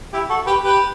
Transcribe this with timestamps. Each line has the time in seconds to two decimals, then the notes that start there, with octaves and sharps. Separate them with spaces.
0.13 E4 G4
0.29 F#4 A4
0.47 G4 B4
0.63 G4 B4